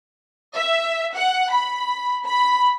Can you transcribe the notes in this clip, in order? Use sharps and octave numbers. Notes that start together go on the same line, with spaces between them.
E5
F#5
B5
B5